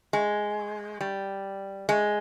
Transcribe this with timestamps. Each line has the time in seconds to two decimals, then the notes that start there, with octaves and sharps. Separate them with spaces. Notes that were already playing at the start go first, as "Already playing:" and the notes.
0.13 G#3
1.01 G3
1.89 G#3